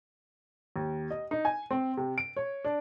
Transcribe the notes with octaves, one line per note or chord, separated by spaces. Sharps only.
D#2
D#5
D#4
G#5
C4
C3
D7
C#5
D4